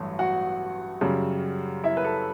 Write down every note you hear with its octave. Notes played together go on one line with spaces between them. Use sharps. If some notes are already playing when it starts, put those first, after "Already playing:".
Already playing: A1 G2 F#3 A3
F#4 F#5
F#2 C#3 G3
E4 E5
B4
A4